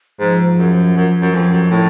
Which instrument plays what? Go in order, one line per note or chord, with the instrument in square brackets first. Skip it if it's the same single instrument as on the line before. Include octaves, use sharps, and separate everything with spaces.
[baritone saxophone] G#2 [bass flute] F3
[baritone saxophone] F#2
F#2
F#2
[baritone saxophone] F2 [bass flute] F3
[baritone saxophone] F#2
A2